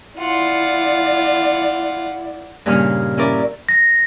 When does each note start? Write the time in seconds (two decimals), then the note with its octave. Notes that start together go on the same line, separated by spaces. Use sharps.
0.18 E4 F4 D5 F#5
2.66 G2 A#2 C#3 D#4 F6
3.17 C#4 E4 A#4 D5
3.69 A#6